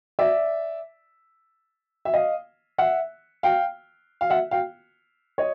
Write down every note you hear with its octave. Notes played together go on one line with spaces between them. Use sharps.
D5 E5
E5
D#5 F5
E5 F#5
F5 G5
F5
E5 F#5
F5 G5
C#5 D#5